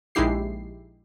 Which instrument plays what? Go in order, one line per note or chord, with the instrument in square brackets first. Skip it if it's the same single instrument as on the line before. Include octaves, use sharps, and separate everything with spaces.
[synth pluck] A#1 G#3 D#4 E4 G4 C7